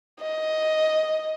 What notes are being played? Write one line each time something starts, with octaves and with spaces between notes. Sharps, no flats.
D#5